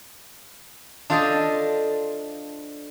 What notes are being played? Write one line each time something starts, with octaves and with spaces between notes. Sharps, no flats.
D4 F4 A4 C5 D5 D#5